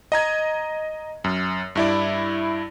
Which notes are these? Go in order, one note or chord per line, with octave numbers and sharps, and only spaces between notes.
D#5 A#5 G#6
F#2
G2 E4 D5